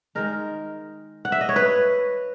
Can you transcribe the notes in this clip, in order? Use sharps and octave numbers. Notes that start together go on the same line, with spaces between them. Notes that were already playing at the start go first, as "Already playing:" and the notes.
D#3 G#3 D#4 A#4
F#5
E5
D#5
C#5
B4